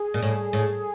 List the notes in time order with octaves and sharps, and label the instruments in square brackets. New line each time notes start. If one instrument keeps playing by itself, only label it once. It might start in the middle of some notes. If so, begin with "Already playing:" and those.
Already playing: [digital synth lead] G#4
[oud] A#2
A2
A2